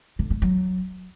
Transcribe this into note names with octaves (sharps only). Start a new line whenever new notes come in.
D3
A3
F#3